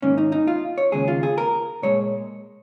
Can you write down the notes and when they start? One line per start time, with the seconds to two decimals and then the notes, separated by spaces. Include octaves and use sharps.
0.02 G#2 D#3 A#3 C#4
0.18 D#4
0.32 D#4
0.47 F4
0.78 C#5
0.92 D#2 C#3 G#3 G#4
1.08 F4
1.23 G#4
1.38 A#4
1.83 A#2 G#3 C#5